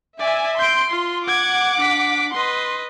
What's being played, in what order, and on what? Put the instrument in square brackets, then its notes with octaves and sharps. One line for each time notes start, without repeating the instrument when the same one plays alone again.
[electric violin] D5 [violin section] E5 G#5
[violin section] C6 [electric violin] G6 D7
[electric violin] F4
[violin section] F#5 D6 [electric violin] G#6
[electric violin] D4 B6
[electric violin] B4 D#5 [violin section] C6